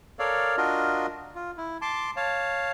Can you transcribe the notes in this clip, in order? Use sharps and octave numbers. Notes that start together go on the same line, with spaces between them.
A4 A#4 C#5 D5 F5
D4 F4 F#4 A#4 D#5
F4
E4
A5 C6 D6
C#5 F5 A5